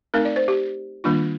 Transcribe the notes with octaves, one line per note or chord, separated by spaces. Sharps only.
A3 C4 D#4 A#4
D5
C5
G4
D#3 G3 A#3 D4 F4